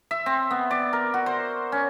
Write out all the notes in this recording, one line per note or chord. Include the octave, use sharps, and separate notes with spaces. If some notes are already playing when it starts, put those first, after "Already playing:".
E5
C4
B3
D5
A#4
F#4
C5
C#4